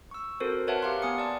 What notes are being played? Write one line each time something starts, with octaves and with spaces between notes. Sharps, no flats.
C#6 E6
C4 F#4 A4 A#4 C5
A#4 B4 C#5 E5 F#5 A5
G4 F5 F#5 A#5 C6
B3 G#5 D#6 C#7
D5 A5